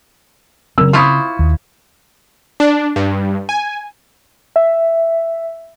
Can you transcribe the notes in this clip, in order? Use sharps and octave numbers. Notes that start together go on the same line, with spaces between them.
F#1 C#3 C4 A#4 E6
E4 F4 C5 C#6 D#6
D#2
D4
G2
G#5
E5